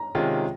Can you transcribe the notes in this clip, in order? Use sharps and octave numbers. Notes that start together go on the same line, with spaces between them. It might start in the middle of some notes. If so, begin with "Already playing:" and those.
Already playing: A#5
C3 D#3 G#3 C#4 F4